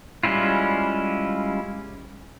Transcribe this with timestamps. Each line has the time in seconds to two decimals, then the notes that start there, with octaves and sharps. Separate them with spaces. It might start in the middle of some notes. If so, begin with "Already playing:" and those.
0.23 G3 G#3 C#4 E4 F4